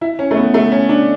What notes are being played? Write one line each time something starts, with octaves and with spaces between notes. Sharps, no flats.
E4
C#4
A3
B3
A3
C#4
D4